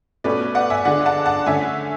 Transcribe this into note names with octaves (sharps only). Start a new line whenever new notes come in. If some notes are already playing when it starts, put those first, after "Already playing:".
B2 A3 C#4 B4 D5
D5 F#5
E5 G#5
D3 G#3 D4 D5 F#5
F#5 A5
F#5 A5
D3 A3 C#4 E5 G#5